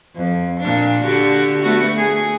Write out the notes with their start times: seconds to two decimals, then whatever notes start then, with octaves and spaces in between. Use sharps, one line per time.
0.15 F2
0.60 A#2 D4
1.03 D3 F#4 G4
1.62 A3 B3 F#4
1.97 G#4